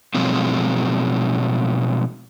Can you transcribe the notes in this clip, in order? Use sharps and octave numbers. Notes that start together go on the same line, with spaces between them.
B2 F3 F#3 G#3 A3 C4